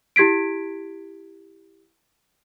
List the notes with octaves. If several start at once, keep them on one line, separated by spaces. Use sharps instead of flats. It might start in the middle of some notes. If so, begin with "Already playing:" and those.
E4 G4 G#6 B6 D7